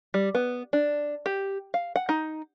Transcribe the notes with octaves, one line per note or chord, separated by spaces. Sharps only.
G3
B3
D4
G4
F5
F#5
D#4